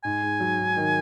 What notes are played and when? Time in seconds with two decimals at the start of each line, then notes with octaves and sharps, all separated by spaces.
0.04 G#2 G#5
0.22 G#2
0.40 F#3
0.59 G#2
0.77 D#3